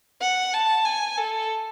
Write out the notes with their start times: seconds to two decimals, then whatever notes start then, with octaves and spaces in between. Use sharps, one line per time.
0.21 F#5
0.53 A5
0.85 G#5
1.17 A4